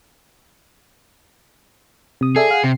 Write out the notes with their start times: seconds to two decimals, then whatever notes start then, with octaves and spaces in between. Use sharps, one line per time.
2.21 C3 D#6
2.36 G#4 A4 D5 E5
2.51 F5 F#5
2.64 C3 C7